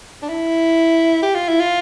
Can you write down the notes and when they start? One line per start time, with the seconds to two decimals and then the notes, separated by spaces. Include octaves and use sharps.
0.23 D4
0.29 E4
1.23 G4
1.35 F4
1.48 E4
1.60 F4